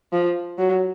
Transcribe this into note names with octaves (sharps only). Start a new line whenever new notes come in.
F3
F#3